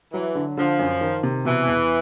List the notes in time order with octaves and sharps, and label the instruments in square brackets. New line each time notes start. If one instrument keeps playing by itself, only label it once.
[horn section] E3 [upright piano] F#3
[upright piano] D3
[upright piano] D3 [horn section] F3
[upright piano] F#2
D#3
C3
[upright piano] B2 [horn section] E3
[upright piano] E2